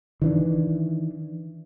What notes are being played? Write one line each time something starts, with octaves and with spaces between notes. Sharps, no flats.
D#3 E3 D4